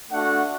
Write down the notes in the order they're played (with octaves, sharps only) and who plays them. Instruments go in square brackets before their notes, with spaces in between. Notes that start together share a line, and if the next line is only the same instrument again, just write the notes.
[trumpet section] A3 D4 F#4 F#5